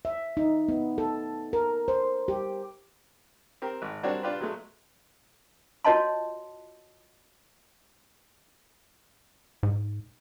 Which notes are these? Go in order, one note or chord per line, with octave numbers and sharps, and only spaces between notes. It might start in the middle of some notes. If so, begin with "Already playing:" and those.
E5
D#4
B3
A4
A#4
C5
G4
C4 G4 A#4
G#1
G3 C4 D4 F#4 A#4 C#5
D4 F4 G4 B4
F#3 G#3 A3
F4 F#4 C#5 D#5 A5 C6
G#2